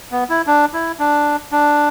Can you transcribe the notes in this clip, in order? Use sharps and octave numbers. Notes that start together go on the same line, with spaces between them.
B3
E4
D4
E4
D4
D4